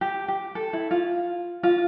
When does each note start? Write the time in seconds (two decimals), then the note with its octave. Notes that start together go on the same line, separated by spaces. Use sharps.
0.01 G4
0.28 G4
0.55 A4
0.73 E4
0.91 F4
1.63 F4